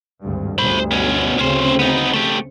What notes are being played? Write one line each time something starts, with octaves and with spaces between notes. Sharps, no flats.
G#1 D2 G2
G1 D2 C5 B5
B2 C#4
D2 C#3 C4 C#4 C5
B3 D#4
A3 G4